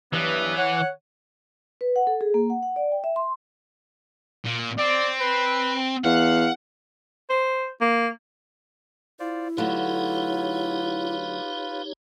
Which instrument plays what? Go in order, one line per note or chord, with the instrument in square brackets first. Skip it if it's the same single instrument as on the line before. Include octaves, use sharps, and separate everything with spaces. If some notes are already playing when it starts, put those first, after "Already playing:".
[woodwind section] G2 F#3 B3 [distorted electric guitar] E3
[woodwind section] C#5 F#5
[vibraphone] B4
F#5
A4
G#4
A#3
F#5
F#5
D5
G5
E5
C6
[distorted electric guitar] A#2
[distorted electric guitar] C4 [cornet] D5
[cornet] B4
[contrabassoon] E2 [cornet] F5 [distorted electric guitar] F#5
[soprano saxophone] C5
A#3
[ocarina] E4 [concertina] F4 C5 D5
[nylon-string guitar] D3 F#3 A3 [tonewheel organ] D#4 G4 C#5 [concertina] F4 B4